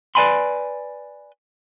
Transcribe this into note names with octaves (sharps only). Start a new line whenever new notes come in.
B4 D5 D#5 G#5 B5 C6